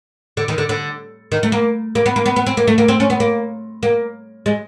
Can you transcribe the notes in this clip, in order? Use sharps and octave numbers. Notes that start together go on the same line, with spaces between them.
D3
D#3
D3
D3
D#3
A3
A#3
A#3
B3
A#3
B3
B3
C4
A#3
A3
A#3
C4
C#4
B3
A#3
A#3
G#3